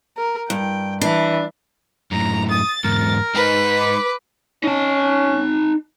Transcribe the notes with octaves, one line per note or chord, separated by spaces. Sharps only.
A#4
G2 G5
E3 D4
F#2 A2 A#5
D#6 A6
E2 G#2 A#4
G#3 D#4 B4
D6
C#4 D#4 A5